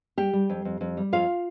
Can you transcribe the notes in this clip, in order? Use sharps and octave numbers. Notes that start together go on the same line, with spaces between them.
G3 G4 G5
G3
F2
F2
F2
G3
F2 F4 F5